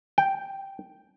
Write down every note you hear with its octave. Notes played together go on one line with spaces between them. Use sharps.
G5